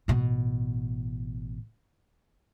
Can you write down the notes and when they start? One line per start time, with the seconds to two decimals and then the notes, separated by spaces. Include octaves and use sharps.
0.08 A1 B2